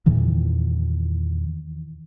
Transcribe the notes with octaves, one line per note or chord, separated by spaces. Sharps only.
E2 A#2 D#3 E3